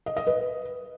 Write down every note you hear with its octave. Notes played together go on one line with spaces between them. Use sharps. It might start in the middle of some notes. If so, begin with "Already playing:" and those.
D#5
D#5
B4